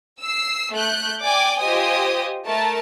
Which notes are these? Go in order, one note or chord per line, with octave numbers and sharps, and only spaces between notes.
E6 C7
A3 F#6 G6
D5 G5 G#5 D6
F4 G4 C5 D#5 G#5 D#6
A3 A#4 A5